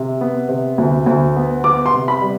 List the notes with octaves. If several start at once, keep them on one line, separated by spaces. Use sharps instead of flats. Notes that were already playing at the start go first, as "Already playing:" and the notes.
Already playing: C3
B3
C3
D2
D2
B3
B3 D6
C6
C3
B5
G3